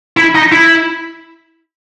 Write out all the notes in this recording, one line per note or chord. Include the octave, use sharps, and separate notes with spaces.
E4
D#4
E4